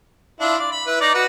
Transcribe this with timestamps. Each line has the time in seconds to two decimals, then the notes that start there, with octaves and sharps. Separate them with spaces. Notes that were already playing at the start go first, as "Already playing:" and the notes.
0.40 D4 E4 F4
0.59 D5
0.71 B5
0.87 E4 B4
1.01 D#4 D5
1.15 F#4 B4